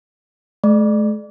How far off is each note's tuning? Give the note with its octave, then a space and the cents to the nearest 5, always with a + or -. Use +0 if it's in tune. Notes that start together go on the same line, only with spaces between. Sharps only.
A3 -45 D5 +25